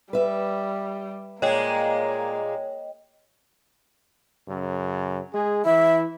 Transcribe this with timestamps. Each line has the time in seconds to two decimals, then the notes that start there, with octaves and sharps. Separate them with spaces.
0.13 G3 B4 E5
1.42 A#2 G#3 A#3 G#4 C#5 D#5 G5
4.47 F#2 C#3
5.33 G#3 G#4
5.64 E3 E4 E5